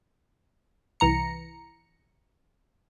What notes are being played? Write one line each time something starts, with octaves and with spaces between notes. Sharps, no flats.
C2 E3 A#5 C#7